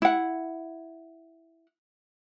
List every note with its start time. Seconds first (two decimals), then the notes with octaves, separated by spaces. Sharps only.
0.02 E4 F#5